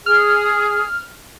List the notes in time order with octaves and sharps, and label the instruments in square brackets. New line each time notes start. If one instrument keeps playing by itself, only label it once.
[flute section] G#4 [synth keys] F6